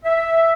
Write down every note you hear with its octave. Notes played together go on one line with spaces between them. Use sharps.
E5